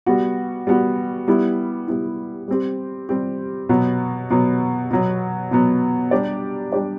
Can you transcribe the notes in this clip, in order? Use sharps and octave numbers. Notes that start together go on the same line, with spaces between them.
G3 B3 F#4
G3 B3 F#4
G3 B3 E4
G3 B3 E4
G3 C4 G4
G3 C4 G4
B2 F#3 B3
B2 F#3 B3
B2 F#3 B3
B2 F#3 B3
G3 D4 G4 D5
G3 D4 G4 D5